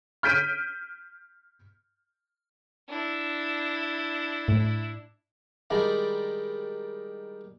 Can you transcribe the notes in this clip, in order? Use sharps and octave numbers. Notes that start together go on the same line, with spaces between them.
F6 G6 B6 D7 D#7
D4 E4
A2
D#3 G3 G#3 D4